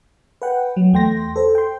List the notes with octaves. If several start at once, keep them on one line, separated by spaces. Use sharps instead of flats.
B4 F#5 G5
F#3
E2 A3 G5 C6 A#6
A4 C5
G5 C6